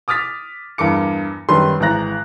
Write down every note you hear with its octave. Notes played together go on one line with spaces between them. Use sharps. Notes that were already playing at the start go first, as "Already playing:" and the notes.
D6 D#6 F6 A6 B6
E2 G2 A#4 D6 C#7
F#2 D#3 G3 B4 C6
G#1 E3 A#5 F#6 A#6